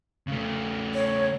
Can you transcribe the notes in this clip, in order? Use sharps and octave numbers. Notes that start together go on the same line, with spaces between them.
C#3 A3
C#5